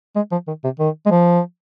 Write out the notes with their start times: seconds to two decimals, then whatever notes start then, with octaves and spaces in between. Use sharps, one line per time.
0.16 G#3
0.32 F3
0.47 D#3
0.64 C3
0.79 D#3
1.06 G#3
1.11 F3